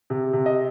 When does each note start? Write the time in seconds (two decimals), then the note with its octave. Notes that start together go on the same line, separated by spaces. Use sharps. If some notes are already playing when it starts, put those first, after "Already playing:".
0.10 C3
0.33 C3
0.46 D#5